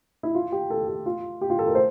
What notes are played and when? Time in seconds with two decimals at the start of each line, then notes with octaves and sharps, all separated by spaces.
0.23 E4
0.35 F4
0.52 G4
0.70 A4
0.88 G4
1.06 F4
1.41 G4
1.50 F4
1.59 A4
1.67 A#4
1.75 C5